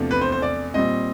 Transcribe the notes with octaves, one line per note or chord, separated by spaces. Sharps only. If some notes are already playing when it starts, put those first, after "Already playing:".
Already playing: E2 C3 F3 A3 D4
B4
C5
C5
D5
A#2 G3 C4 D#5